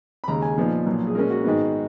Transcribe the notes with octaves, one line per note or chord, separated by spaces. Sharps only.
B5
D#2 C#3 G#3 A#5
G#5
A#2 F3 B3 D#4
B1 A#2 F3
G#4
A#2 G#3 C#4 A#4
F#4
G#2 D#3 G#3 B3